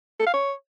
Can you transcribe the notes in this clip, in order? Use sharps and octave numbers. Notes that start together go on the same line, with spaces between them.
A4
F5
C#5